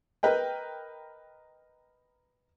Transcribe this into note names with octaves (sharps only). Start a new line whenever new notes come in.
A#4 B4 D#5 G5